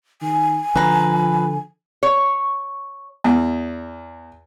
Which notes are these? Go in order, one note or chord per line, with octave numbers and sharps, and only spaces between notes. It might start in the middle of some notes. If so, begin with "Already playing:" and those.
D#3 G#5
D3 F3 B4 A#5
C#5
E2